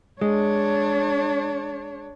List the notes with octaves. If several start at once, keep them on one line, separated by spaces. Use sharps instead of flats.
G#3 D4 C#5